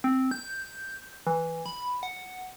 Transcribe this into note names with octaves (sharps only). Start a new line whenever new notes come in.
C4
G6
E3
B5
F#5